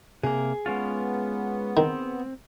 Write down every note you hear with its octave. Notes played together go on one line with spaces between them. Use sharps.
C3 A#3 G#4
G#3 B3 C#4 F4
D#3 C4